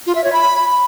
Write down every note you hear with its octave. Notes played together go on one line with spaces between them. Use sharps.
F4
E5
C#5
B5